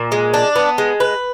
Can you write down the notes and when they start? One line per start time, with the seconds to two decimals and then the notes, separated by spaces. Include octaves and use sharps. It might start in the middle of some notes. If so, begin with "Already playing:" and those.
Already playing: A#2
0.12 G#3
0.34 D4
0.56 B3
0.78 G#3
1.00 B4